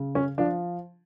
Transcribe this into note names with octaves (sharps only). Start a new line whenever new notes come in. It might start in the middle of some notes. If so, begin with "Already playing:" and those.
Already playing: C#3
C#4
F3 D4